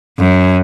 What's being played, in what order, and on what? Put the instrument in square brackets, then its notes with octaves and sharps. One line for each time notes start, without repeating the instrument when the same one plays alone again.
[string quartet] F#2